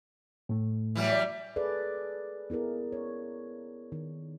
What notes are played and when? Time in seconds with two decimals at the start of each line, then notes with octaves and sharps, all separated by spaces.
0.49 A2 A3
0.95 E3 F#3 G3
1.12 D5
1.56 G#4 A4 B4 D5
2.50 B3 E4 G#4 A#4
2.92 C#5
3.92 D#3